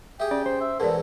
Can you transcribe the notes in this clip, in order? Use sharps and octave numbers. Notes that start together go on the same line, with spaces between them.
G4 G#4 E5 G5
C#4 D5
C5
E5
E2 G#2 B2 A4 A#4 D5